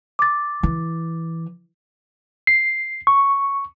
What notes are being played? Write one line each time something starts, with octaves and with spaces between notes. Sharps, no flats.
D6 A6
E3
C7
C#6